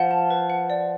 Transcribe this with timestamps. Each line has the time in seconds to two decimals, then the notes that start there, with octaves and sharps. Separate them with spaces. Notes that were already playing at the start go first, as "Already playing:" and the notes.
Already playing: F3 F#5
0.11 A5
0.31 B4
0.50 F#5
0.70 D5